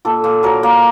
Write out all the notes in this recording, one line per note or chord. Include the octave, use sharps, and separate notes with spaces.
A#2 A4
A#2
F#3 A#4
A#3